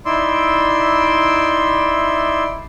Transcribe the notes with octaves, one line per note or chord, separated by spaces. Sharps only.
D#4 E4 D5 C6 E6